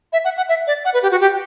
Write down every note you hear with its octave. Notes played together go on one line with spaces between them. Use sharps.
E5
F#5
F#5
E5
D5
F#5
B4
G4
F#4
G4